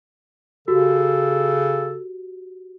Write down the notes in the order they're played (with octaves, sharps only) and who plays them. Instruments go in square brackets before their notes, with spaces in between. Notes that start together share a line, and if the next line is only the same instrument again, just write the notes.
[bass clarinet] C#3 [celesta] F#4 G4 [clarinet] A4